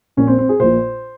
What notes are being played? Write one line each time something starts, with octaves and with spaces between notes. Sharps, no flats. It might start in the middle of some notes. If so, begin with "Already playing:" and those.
A#1 A#2 C#4
C4
C4
G#4
A#1 A#2 C5